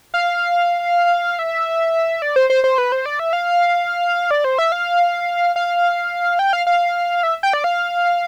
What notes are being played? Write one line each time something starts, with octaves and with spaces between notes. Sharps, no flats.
F5
E5
D5
C5
C5
C5
B4
C5
D5
E5
F5
D5
C5
E5
F5
F5
G5
F5
F5
E5
G5
D5
F5